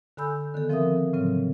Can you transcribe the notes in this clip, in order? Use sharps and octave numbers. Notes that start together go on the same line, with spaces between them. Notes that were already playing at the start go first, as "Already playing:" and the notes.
D3 A4 G#5 B5 E6 G6
D3 D#3 B3 A4
F3 C4 A#4 E5 D#6
A2 C#3 F#3 C4